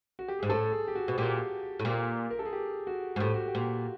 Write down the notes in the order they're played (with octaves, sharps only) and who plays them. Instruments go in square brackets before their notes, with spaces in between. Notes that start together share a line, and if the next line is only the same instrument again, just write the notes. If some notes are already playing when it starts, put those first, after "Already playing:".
[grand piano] F#4
G4
[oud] G#2 [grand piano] G#4
[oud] A2 [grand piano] A4
[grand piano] G#4
G4
F#4
[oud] B2
[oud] A#2 [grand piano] G4
[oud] A2
A#2
[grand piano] A#4
A4
G#4
G4
F#4
[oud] G#2
[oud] A2 [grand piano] G4
[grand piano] F#4
G4
[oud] A#2